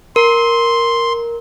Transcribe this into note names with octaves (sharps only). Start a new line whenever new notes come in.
A#4 C6